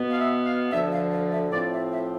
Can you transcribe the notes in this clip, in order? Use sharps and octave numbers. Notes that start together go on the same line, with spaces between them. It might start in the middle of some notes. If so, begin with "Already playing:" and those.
Already playing: B2 B3
F5
E5
F5
D2 D3 F3 E5
F5
F5
E5
A2 F3 C4 D5
E5
E5